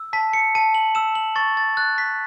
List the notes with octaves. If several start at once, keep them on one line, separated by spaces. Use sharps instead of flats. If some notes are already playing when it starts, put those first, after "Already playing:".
Already playing: E6
A5 B6
C#7
A5 D#7
F#7
E6 E7
F#7
C#6 A6
A6
F#6 A6
B6